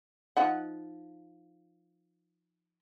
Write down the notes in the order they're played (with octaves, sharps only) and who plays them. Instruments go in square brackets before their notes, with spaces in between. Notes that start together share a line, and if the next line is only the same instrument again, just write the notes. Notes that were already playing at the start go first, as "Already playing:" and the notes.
[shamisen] F3 D#4 F#5